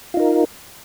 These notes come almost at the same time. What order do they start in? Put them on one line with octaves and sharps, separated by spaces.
F4 D#4 A#4